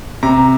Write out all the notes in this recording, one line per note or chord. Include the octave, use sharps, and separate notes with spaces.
C3 A#5